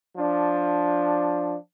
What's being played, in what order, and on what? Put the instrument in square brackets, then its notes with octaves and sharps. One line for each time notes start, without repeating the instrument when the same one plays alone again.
[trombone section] F3 D4